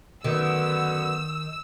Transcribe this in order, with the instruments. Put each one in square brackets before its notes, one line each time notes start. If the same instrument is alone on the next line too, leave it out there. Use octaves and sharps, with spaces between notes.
[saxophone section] F#2 D3 B3 [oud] D#3 [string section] E6